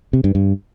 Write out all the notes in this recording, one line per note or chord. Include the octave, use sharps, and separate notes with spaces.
C3
G2
G2